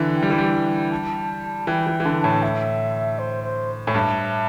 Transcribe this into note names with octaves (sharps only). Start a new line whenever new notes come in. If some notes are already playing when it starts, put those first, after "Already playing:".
Already playing: D3 E3
G5
G3
E3
G3
A5
E3 G5
E3
E3
D3 A5
A2 A5
E5
C5
C5
A2
G2 E5